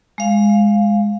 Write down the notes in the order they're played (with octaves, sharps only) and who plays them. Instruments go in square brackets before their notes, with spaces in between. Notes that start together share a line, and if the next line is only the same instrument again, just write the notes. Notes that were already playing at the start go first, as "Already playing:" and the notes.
[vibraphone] G#3 F5